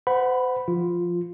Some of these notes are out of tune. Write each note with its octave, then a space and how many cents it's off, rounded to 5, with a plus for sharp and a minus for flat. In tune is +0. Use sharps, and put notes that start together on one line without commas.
C5 -40 F#5 +0 B5 +0
F3 -5 F4 +0